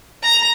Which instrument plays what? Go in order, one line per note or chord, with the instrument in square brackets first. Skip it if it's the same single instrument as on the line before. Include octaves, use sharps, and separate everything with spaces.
[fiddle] A#5